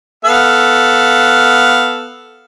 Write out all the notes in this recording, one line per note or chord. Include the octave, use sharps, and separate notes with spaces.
B3 A4 F5